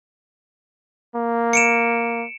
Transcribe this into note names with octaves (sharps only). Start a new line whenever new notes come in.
A#3
C#7 D7 E7